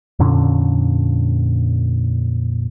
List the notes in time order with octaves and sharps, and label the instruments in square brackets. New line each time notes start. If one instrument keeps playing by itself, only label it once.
[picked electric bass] F2 A#2 D3 C#4